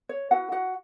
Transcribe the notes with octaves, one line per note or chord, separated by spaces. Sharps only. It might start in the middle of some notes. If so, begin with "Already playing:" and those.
C#5
E4 F#4 B4 F#5
F#4 F#5